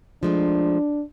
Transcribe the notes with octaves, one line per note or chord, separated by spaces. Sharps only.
F3 G#3 A3 D4